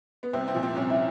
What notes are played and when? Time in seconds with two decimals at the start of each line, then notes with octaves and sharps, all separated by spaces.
0.23 B3
0.33 C2 C4
0.48 C4
0.55 A#2 F3
0.63 C4
0.76 C2 C#4
0.90 E4